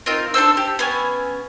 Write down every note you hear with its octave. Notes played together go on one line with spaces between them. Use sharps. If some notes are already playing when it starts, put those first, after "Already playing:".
C4 D#4 F4 A#4
D4 A4 C5 E6
G4
B3 C#4 G#5